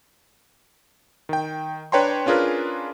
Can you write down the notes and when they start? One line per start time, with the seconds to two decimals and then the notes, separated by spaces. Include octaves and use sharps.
1.29 D#3 G5
1.92 D4 B4 C#5 G5 A#5 C6
2.26 C#4 D4 F4 G#4 A#4 B4